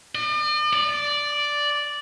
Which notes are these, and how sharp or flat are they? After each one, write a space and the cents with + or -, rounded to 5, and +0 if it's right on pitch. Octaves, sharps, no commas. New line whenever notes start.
D5 +45
D5 -5